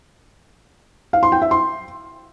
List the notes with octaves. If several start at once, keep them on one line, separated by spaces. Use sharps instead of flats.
F5
C6
G5
E5
C6